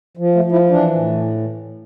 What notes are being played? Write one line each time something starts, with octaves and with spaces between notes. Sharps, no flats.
F3
A3
F3
E4
E3 D4
A2